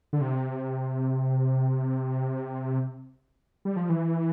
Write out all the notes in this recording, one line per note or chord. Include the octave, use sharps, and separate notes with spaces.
D3
C3
G3
F3
E3